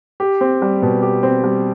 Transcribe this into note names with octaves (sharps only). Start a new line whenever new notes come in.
G4
C4
G3
B2
G4
C4
G3